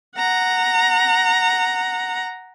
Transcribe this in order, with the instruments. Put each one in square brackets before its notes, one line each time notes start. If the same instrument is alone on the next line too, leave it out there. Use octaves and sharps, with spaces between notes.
[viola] F#5 A#5